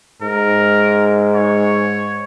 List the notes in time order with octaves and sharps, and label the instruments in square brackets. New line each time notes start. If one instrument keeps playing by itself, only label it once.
[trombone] G#2 [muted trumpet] A#4
[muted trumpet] C#5